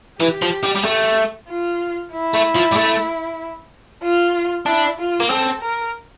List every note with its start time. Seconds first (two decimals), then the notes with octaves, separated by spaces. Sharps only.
0.21 E3 G4
0.42 F3
0.63 G3
0.75 G3
0.84 A3
1.48 F4
2.12 E4
2.34 A3
2.55 F3
2.71 G3
2.76 A3
4.03 F4
4.66 D4 E4
4.98 F4
5.20 A#3
5.30 C4 A4
5.61 A#4